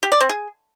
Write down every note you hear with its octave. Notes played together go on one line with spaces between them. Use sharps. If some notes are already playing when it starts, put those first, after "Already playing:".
G4
D5
C4
G#4